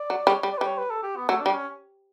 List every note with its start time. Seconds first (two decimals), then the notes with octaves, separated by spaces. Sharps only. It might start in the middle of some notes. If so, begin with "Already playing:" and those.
Already playing: D5
0.10 F#3
0.27 G3 C#5
0.43 G3
0.53 D5
0.58 B4
0.61 G3 C#5
0.78 B4
0.91 A4
1.03 G4
1.16 B3
1.29 F#3 A3
1.42 G3 D4
1.54 C#4